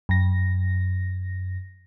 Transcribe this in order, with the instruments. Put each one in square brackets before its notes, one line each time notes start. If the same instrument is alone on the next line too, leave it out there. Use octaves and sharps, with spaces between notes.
[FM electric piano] F#2 A#6